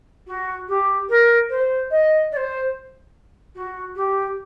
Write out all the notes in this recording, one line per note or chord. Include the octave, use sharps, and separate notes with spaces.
F#4
G4
A#4
C5
D#5
D5
C5
F#4
G4